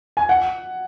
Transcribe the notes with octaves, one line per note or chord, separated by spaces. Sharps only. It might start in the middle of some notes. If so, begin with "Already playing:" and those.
G#5
F#5